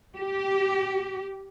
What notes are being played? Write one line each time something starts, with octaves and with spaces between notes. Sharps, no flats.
G4